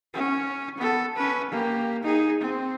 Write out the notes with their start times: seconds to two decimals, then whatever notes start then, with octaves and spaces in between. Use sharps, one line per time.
0.14 C#4
0.78 B3 A4
1.17 C#4 B4
1.50 A#3 G4
2.04 D#4 G#4
2.41 C4